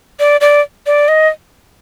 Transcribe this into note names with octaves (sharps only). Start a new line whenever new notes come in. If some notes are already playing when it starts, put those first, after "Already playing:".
D5
D5
D5
D#5